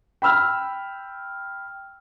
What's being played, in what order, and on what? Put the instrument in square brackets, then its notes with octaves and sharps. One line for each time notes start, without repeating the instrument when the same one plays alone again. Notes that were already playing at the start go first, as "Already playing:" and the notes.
[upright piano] G5 B5 E6 F6